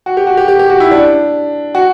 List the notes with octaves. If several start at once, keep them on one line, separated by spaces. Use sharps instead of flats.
F#4
G4
F#4
G4
G4
G4
F#4
E4
D4
F#4